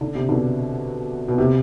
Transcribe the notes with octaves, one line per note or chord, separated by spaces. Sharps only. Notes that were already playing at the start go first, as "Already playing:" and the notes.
D3
C3
B2 D3
B2
C3